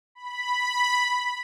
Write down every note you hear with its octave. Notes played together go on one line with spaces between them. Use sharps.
B5